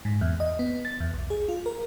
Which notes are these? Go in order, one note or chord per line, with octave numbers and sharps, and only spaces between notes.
G#2
E2
D#5
B3
A6
E2
B1
G#4
F4
A#4